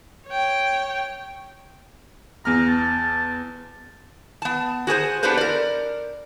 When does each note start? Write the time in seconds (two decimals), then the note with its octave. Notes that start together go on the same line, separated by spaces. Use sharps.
0.27 C#5 G5
2.45 E2 A#5 F6
2.68 A5
4.42 B3 A5
4.87 F#4 G#4 A#4 C5
5.23 B3 D4 G4 A4 B4 C5
5.37 A#4 D5